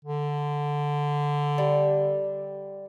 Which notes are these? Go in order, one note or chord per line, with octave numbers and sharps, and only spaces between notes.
D3
G3